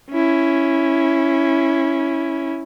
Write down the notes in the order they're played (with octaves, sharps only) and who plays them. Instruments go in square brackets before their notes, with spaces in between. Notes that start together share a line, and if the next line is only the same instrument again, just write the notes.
[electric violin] C#4 E4